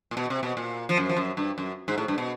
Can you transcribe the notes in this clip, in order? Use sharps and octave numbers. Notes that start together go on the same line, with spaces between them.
A#2
B2
C3
B2
A#2
F3
F#2
F3
F#2
G2
F#2
G#2
A2
G2
B2